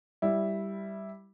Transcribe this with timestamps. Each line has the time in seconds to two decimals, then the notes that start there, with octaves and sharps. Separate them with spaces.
0.22 G3 E4